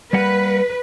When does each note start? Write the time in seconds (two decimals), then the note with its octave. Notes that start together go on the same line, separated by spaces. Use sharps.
0.13 G3 A#3 B4 F#5